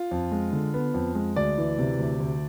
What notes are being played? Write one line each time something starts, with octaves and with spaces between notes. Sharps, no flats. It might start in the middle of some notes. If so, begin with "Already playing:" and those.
Already playing: F4
F2
G#3
D3
B3
F2
G#3
D2 D5
E3
C3
D2
D2